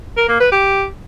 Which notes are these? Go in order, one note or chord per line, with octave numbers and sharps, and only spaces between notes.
A#4
A#3
B4
G4